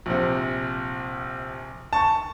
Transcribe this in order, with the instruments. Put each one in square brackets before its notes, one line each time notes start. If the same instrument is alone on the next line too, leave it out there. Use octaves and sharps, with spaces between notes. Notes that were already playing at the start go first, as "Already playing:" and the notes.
[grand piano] A#1 C3
A5 C#6